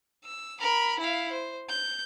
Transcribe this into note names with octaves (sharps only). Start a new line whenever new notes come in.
E6
A#4 B5
E4 F5
C5
G6